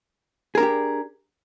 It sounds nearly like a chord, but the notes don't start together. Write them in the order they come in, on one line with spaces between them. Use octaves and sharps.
G#4 A#4 D4 G4